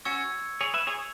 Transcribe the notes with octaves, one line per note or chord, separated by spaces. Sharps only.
C#4 F#4 C#6 E6 G#6 C#7
G#4 C#5
B4 E5
G#4 C#5